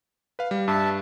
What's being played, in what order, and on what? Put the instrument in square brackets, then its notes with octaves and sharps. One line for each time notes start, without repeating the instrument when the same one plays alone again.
[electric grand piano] B4 F5
G3
[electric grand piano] G2 [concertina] E5 A5